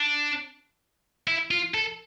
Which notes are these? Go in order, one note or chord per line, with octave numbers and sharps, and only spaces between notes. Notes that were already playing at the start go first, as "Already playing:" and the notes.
Already playing: D4
E4
F4
A4